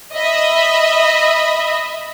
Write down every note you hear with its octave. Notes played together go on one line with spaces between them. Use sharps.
D#5 E5 B5